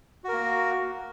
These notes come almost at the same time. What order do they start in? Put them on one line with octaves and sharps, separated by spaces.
F#4 A#4 A#3